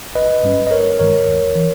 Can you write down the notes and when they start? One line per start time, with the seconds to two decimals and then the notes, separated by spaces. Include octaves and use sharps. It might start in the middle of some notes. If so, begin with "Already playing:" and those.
0.15 G1 B4 D#5
0.43 G2 G3 C#4
0.67 D#5
0.71 G1 A#4 C#5
0.99 G2 D#3 G#3 A#4 C#5
1.27 D#2
1.56 E3